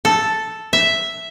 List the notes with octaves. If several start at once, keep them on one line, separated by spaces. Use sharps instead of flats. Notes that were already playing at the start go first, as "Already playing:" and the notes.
A4
E5